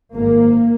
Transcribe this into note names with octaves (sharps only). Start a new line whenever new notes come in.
G#1 G#2 A#3